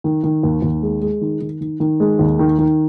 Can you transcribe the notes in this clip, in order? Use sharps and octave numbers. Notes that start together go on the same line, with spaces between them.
D#3
D#3
D#2
D#2
G#3
G#3
D#3
D#3
D#3
D#3
G#3
D#2
D#3
D#3